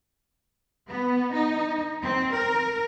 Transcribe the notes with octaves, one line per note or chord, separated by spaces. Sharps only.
B3
D#4
C4
A#4